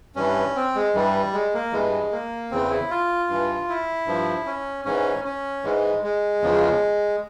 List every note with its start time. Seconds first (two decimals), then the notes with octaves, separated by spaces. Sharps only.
0.16 G2 E3 C#4
0.56 C4
0.76 G#3
0.94 G2 E3 G3
1.33 G#3
1.54 A#3
1.72 G2 E3 G#3
2.12 A#3
2.51 E2 C#3 E3 C4
2.70 E4
2.91 F4
3.29 G2 E3
3.69 E4
4.07 G2 F3
4.46 C#4
4.85 G#2 E3 C#4
5.24 C#4
5.64 G#2 E3 G#3
6.03 G#3
6.42 E2 C#3 F3